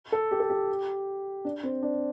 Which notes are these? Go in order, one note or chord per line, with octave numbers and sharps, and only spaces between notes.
A4
G4
A4
G4
D4
C4
D4